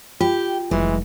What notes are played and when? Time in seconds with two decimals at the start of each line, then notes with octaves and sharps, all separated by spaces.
0.21 F4 G4
0.71 F1 E3 F#3 G#3